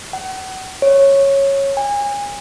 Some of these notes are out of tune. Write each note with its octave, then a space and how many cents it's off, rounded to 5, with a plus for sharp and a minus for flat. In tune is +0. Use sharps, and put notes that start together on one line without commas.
F#5 +35
C#5 -10
G#5 -30